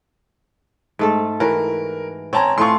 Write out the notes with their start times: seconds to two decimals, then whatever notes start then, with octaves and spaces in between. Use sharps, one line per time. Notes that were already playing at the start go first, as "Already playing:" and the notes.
0.99 G#2 A3 A4
1.40 E3 F#4 A#4
2.33 C4 C#4 C#5 A5 A#5
2.58 A2 A3 F4 C6 C#6